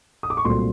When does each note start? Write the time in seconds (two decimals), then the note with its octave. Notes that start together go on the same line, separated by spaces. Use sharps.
0.23 D#6
0.30 D6
0.37 C#6
0.45 C2 A#2 F#3 A3 C4 C6